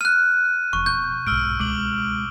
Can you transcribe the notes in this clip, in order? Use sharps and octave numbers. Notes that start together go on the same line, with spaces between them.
F6 F#6 D#7
F1 F2 C#6
B2 G6
B1 G#2 E6 F6 D7
C#2 B2 G#3 D6 D7 F#7